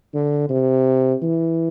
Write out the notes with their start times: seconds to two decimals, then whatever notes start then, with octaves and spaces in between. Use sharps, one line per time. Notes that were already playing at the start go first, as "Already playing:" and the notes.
0.14 D3
0.49 C3
1.22 E3